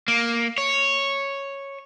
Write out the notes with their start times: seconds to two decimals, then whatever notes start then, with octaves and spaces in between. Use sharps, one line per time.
0.08 A#3
0.58 C#5